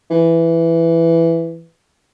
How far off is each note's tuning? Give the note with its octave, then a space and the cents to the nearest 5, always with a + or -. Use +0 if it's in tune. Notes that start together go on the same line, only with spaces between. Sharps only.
E3 +10